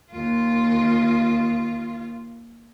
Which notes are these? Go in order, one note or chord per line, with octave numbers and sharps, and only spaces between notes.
D#2 F4